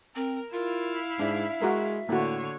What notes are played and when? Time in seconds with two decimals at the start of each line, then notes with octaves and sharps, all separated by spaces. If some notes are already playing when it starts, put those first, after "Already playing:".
0.15 C4 A#4
0.53 E4 F4 A#4 F5
1.20 G#2 D4 E5
1.62 G#3 F#4 A#4
2.09 A2 D3 A#3 F#4 C#5